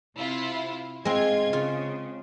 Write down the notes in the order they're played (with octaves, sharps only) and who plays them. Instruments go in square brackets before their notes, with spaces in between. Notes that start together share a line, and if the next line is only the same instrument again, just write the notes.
[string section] C3 E4 F4
[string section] G#2 F4 G#6 [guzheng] G#3 C4
[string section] C#3 [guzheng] F4